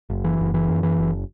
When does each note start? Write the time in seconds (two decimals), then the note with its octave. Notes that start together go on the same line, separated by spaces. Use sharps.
0.10 F#1
0.25 E3
0.40 F#1
0.54 E3
0.68 F#2
0.83 E3
0.99 F#1